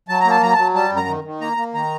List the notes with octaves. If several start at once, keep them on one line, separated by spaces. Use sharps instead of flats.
F#3 A5
A#5
A#3
A5
F#3 A#5
A5
F#3
G3 A5
F#2
A#5
D#3
D#3
A#3 A#5
A#3
D#3 A#5